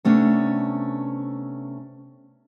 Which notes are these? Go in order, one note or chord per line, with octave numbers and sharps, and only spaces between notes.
C3 A3 B3 C#4 D4